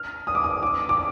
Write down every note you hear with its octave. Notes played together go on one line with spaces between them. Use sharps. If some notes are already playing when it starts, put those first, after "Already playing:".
Already playing: F6
D#6
D6
D#6
D6
D6